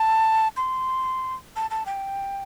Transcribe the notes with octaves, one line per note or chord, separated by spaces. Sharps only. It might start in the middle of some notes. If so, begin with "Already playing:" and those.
Already playing: A5
C6
A5
A5
G5